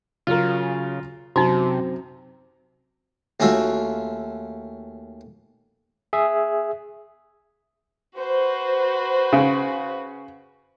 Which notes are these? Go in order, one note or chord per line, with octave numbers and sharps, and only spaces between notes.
C#3 F#3 F4 A#4
F#2 C3 C4 D#4 F#4 A#5
D#2 A3 C#4 F4 F#4 E5
G#4 E5
F#4 B4 C5
C#3